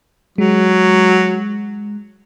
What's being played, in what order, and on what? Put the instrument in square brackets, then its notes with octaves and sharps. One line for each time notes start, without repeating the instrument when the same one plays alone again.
[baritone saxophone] F#3 [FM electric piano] G#3